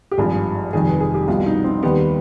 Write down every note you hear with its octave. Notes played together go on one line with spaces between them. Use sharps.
G4
G#1 G2 F3 G#4
F1 F2 D#3 G3 G#4
B4
G#4
G4
C2 B2 G3 F4
D#4
C4
D#2 D#3 G3 B3